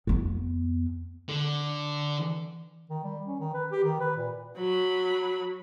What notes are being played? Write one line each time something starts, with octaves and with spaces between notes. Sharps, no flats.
F2 B3
D3
D#3
G3
C#4
D#3
B4
G4
D#3
B4
A#2
F#3 B5